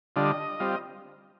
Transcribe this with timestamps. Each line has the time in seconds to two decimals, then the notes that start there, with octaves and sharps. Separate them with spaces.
0.16 D3 G3 D4 F4 D#5
0.60 G3 C4 F4